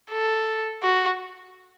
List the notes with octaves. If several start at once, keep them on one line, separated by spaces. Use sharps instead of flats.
A4
F#4